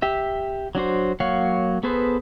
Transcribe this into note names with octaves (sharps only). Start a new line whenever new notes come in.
G4 E5
F#3 D4 F#4 C5
F#3 A#3 C#5 F5 F#5
B3 G#4 A4 B4 C5